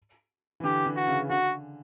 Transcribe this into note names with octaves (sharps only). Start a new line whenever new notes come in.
E3
D3 G4
D3
F#4
C#3
D3 F#4